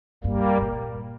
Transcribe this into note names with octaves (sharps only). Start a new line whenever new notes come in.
G2 G3 A#3
A#2